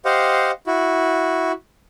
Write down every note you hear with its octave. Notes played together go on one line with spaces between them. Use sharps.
G4 C5 D#5 F5 F#5
E4 F#4